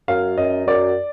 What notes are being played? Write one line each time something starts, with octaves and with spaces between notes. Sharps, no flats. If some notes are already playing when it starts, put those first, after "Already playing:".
F#2 F5
F#2 D#5
F#2 D5